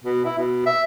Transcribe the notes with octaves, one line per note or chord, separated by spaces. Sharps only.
B2
E4
B2
E5